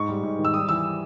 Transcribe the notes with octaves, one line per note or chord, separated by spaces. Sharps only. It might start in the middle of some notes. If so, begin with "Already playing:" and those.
Already playing: G#2 C#6
G3
G#2
D#3
E6
G3 D#6
E3 E6